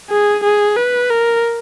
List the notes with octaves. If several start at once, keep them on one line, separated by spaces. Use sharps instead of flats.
G#4
G#4
B4
A#4